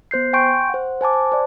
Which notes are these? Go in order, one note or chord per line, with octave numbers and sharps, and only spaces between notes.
B3 C5 G6 C7
G5 G#5 C6 C#6 G6 D7
C5 F#5
C5 G#5 A5 D6
A5
C5 D5